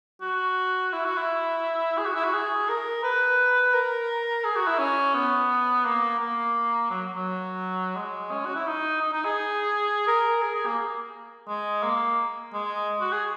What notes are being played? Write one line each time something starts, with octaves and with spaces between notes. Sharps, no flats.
F#4
E4
F#4
E4
G#4
F#4
E4
F#4
G#4
A#4
B4
A#4
G#4
F#4
E4
C#4
B3
A#3
A#3
F#3
F#3
G#3
C#4
F#4
E4
D#4
D#4
D#4
G#4
A#4
G#4
G#4
A#3
G#3
A#3
G#3
F#4
G#4